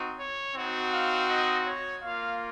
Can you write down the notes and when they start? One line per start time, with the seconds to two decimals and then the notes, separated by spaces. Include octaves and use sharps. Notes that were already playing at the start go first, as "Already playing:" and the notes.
Already playing: C4 D#4 F#4
0.19 C#5
0.55 C4 D#4 F#4
0.92 F5
1.29 D#5
1.66 C#5
2.02 A#3 F4 F5